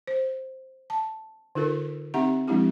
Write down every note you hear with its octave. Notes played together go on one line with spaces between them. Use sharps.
C5
A5
D3 D#4 F4 A4 A#4
C4 D#4 G4 E5 F#5 A#5
F3 G#3 C4 D4 E4 G4